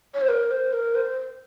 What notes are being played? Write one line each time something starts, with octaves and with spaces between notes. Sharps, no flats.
C#5
C5
A#4
C5
A#4
C5